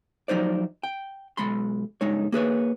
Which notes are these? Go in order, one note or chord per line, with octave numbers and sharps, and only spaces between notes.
F3 F#3 D#4 C5 D5
G5
B1 G#3 B5 C6
C#2 G2 G#3 D#4 C#5
A#3 G#4 B4 C#5